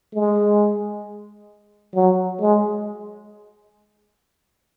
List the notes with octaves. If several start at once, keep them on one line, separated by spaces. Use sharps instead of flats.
G#3
F#3
G#3